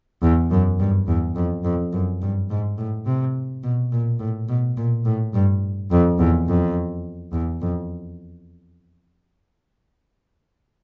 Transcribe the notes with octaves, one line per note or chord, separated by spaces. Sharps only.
E2
F#2
G2
E2
F2
F2
F#2
G2
G#2
A2
C3
B2
A#2
A2
B2
A#2
A2
G2
F2
E2
F2
E2
F2